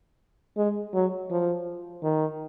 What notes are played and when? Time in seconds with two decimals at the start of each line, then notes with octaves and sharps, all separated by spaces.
0.57 G#3
0.94 F#3
1.31 F3
2.03 D#3